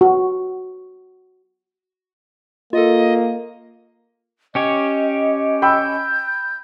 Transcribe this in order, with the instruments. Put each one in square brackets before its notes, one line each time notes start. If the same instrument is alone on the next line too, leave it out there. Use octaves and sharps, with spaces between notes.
[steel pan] F#4
[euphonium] A#3 [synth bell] F4 A4 [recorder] D#5
[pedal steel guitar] C#4 G4 C#5 [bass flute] D#5
[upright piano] G5 B5 E6 [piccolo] G6